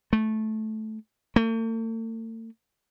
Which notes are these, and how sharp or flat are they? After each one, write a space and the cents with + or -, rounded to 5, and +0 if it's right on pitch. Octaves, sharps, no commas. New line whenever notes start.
A3 -15
A3 +45